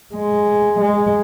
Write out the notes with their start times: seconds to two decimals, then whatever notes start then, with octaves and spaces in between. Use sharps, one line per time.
0.14 G#3
0.80 G#3